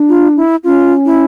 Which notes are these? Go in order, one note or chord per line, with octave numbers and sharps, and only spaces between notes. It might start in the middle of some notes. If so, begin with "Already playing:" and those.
Already playing: D4
F4
E4
C#4 F4
E4